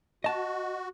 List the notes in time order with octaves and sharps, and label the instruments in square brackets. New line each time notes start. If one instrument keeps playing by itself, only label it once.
[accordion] F#4 [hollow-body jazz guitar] D#5 A5